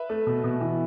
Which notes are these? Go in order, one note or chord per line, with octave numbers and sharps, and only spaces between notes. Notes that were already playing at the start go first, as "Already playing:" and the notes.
Already playing: B4 E5
A3
B2
B2
E3